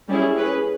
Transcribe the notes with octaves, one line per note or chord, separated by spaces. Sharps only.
G3 C#4 E4 G#4
C#4 G#4 B4